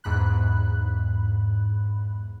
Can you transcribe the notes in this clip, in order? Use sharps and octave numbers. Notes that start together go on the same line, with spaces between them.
E2 G#2 B5 F#6